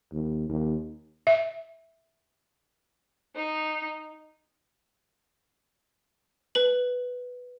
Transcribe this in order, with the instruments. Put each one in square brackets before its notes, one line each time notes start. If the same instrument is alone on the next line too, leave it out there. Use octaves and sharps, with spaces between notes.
[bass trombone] D#2
D#2
[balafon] E5
[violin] D#4
[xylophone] B4 F#7